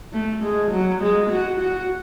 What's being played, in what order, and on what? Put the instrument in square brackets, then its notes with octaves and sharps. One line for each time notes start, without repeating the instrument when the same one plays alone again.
[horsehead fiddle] A3
G#3
F#3
G#3
F#4
F#4